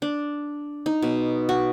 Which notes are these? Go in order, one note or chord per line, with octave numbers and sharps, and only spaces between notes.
D4
D#4
B2
F#4